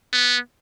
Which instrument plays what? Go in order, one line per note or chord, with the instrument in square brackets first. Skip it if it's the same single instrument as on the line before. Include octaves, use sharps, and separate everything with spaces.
[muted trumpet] B3